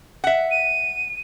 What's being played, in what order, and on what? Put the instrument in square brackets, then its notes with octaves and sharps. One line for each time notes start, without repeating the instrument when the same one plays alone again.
[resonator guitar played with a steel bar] E5 F#5
[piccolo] D#7